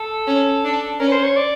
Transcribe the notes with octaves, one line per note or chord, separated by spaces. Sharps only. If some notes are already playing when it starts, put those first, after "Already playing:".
Already playing: A4
C#4
D4
C#4 A#4
B4
C5
C#5
D5